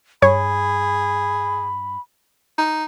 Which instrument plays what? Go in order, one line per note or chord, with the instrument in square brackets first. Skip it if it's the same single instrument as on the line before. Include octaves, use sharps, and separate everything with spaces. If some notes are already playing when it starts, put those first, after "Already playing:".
[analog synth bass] G2 [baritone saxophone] G#4 [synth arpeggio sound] C#5 [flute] B5
[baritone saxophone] D#4